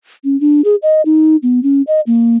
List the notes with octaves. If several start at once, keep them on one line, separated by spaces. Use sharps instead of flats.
C#4
D4
G#4
D#5
D#4
B3
C#4
D#5
A#3